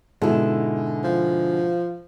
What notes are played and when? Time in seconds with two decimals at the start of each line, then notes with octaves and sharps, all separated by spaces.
0.22 G#2 B2 D3 G#3 E4
1.04 F3